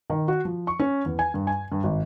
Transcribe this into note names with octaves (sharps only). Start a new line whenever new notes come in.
D#3
F#4
F3
C#6
C#4
E2
G#5
G2
G#5
G2
G#1